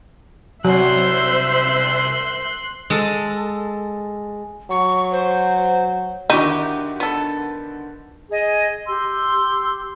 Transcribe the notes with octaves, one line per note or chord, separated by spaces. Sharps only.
C2 F#3 C5 E5 C6 F#6
G#3 A4
F#3 C#6
C5
D3 D#3 D#4 E4 F#4 G4
B3 A4
G#4 D#5
G4 C6 E6